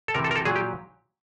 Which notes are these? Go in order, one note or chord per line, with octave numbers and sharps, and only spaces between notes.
A4
C3 E3 A#4
A4
A#4
A4
A#2 F#3 G#4
G4